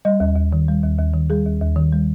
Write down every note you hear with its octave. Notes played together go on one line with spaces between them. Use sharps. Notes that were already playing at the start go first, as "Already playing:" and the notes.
G3 D#5
D#2
D#2
D#3
G3
D#2
D#2
D#3
G3 G#4
D#2
D#2
D#3
G3